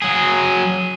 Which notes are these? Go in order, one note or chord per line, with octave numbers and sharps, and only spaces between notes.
F#3 G#4